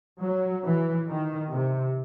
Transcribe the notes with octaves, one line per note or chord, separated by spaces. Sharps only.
F#3
E3
D#3
C3